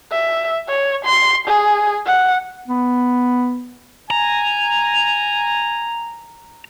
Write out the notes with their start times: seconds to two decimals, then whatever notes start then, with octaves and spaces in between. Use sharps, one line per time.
0.12 E5
0.68 C#5
1.05 C6
1.47 G#4
2.06 F#5
2.68 B3
4.10 G#5 A#5